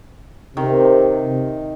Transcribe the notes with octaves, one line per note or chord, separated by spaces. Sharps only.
C3 D#3